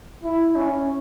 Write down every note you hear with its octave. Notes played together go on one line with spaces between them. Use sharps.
E4
C#4